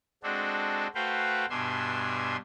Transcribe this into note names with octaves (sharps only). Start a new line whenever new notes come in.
G#3 C4 D4 F#4 A4
A3 F#4 B4 C5 F5 G5
G2 B2 D4 E5 G#5 C6